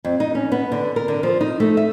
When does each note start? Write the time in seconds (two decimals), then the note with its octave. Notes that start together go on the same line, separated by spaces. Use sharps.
0.05 F2
0.20 D#4
0.35 C#4
0.52 B3
0.72 D3
0.96 A#4
1.08 D3
1.23 F3
1.41 D#4
1.60 A3
1.77 E5